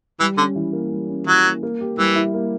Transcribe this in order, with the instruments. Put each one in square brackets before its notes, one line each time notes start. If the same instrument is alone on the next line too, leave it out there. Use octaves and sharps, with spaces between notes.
[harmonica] E3 [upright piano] G3
[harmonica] D3 [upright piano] C#4
[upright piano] E3
A#3
G3
C#4
[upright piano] E3 [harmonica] F#3
[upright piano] A#3
A#3
G4
[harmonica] E3 [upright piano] G3
[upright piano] E4
A#3